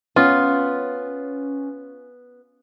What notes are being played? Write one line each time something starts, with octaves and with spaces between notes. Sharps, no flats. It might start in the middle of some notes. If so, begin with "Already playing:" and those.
B3 C#4 F4